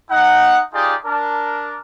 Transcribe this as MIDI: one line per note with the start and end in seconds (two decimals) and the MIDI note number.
0.10 0.61 63
0.10 0.61 78
0.73 0.95 63
0.73 0.95 65
0.73 0.95 67
0.73 0.95 68
0.73 0.95 74
1.05 1.79 62
1.05 1.79 70